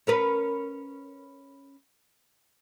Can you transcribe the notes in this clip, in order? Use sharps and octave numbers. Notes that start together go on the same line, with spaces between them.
C#4 A#4 B4